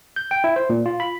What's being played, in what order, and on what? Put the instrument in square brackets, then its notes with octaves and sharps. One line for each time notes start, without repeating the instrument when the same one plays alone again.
[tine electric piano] G6
G5
E4
C5
A#2
F4
B5